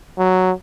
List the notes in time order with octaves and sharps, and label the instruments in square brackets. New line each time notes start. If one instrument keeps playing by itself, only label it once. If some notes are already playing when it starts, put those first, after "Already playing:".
[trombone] F#3